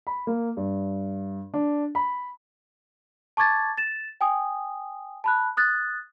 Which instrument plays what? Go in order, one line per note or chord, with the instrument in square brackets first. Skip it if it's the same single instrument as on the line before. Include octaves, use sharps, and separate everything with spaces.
[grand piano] B5
A#3
G2
D4
B5
[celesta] A5 C#6 D6 G#6 A6
A6 E7
G5 G#5 D#6
A5 B5 F#6
D#6 F#6 A6